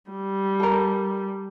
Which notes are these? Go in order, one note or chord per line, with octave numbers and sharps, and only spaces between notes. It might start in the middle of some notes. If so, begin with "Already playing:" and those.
G3
A4 A#4